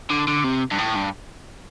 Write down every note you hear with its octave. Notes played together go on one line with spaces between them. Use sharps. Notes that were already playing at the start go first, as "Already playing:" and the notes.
D3
D3
C3
G2
A2
G2